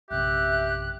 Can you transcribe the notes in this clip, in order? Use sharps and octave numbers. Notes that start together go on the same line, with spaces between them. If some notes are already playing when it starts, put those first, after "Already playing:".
A#1 F#2 C3 G4 E5 F#6